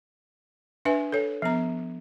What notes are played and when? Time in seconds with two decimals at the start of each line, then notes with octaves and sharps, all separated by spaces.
0.85 D4 B4 E5 G#5
1.12 A4 C#5
1.42 F3 B3 A#5